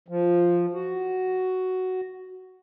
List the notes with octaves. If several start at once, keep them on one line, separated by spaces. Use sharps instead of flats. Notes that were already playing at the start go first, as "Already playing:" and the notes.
F3
F#4